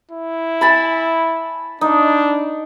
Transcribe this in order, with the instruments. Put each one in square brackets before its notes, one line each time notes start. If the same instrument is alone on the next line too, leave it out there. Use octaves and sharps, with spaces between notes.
[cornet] E4
[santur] G#5 A5 B5
[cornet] D4 [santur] D#4